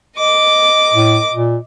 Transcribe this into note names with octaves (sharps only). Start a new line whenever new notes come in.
D#5 D6
A2
A#2